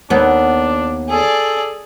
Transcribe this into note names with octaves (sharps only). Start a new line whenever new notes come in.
D#2 B3 D4
G#4 A4 D5